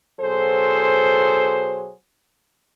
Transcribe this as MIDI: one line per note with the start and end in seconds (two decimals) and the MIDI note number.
0.20 1.91 47
0.20 1.91 54
0.20 1.91 68
0.20 1.91 69
0.20 1.91 72